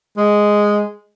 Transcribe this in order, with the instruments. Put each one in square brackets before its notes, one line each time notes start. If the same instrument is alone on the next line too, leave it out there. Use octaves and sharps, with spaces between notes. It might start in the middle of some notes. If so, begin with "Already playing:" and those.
[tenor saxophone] G#3